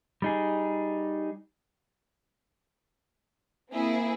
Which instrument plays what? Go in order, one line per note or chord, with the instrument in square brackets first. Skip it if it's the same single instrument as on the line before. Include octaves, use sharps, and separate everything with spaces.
[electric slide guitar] G3 D#4 G#4
[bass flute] A#3 [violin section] C4 E4 G#4